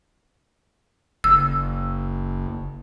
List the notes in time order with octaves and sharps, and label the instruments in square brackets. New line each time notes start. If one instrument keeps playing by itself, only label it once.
[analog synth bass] F#1 [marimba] E6